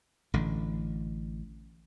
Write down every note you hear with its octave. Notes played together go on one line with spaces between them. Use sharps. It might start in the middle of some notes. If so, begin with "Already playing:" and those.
A1 D3